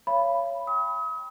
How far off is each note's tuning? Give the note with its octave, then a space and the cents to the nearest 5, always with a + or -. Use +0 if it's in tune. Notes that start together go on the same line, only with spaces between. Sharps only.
C#5 +0 F5 -40 B5 +0
G5 +0 D#6 +40